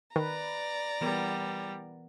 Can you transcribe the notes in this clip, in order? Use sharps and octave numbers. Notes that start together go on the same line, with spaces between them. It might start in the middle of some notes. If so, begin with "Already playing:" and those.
D#3 B4 D5 A#5
E3 G3 B3 A#4